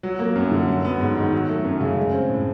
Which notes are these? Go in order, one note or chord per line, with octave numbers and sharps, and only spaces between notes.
F#3
A#3
F#2
D3
F#3
B3
G#2
D#3
F#3
A3
F#2
C#3
G#3
C4
A2